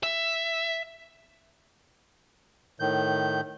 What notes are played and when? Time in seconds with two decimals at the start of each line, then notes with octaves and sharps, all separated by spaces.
0.03 E5
2.80 A2 D#3 G6